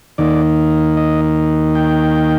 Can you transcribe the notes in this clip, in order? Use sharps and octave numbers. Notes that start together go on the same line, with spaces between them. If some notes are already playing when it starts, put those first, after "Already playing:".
D#2 D#3 A#3 D#4 D5
D#5
G5